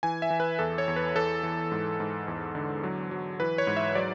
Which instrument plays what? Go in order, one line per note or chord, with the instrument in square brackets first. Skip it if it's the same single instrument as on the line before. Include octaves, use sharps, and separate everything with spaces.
[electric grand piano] E3 G#5
E5
E3
B4
E2 A4
C#5
E2
B4
E3 A4
E3
G#2
G#2
E2
D3
F#3
F#3
E3 B4
C#5
G#2
E5
F#3 D5